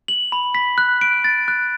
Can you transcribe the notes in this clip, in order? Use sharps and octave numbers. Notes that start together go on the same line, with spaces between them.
F#7
B5
B6
F#6
D7
A6
F#6